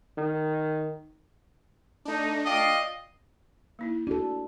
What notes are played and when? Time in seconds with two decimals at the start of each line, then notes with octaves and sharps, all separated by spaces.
0.17 D#3
2.05 A3 D4 D#4
2.45 F4 D5 D#5 F5 G5
3.79 A#3 D#4 E4
4.07 D4 F#4 A4